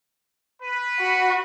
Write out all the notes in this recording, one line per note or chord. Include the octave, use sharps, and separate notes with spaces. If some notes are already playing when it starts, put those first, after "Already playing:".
B4
F#4